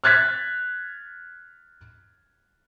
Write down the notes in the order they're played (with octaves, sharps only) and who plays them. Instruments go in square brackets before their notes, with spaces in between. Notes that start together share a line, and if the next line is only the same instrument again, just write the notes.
[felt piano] F6 F#6 G#6 A6 B6